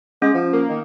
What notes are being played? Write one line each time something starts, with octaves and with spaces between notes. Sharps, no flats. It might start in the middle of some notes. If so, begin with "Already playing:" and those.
G#3 C#4
F3
A#3
D#3